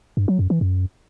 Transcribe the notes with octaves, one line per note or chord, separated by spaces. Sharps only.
G2
F#3
F#2
E3
F#2